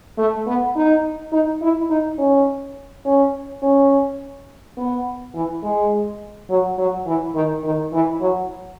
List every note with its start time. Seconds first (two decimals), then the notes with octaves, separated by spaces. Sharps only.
0.18 A3
0.47 B3
0.75 D#4
1.32 D#4
1.61 E4
1.90 D#4
2.18 C#4
3.05 C#4
3.62 C#4
4.77 B3
5.35 E3
5.63 G#3
6.50 F#3
6.78 F#3
7.06 E3
7.35 D#3
7.64 D#3
7.93 E3
8.21 F#3